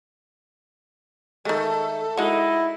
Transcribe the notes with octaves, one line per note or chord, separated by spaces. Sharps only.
D#3 G#3 A3 A4
G#3 D#4 E4 F#4